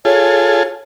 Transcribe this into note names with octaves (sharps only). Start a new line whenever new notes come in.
F4 G#4 A4 C#5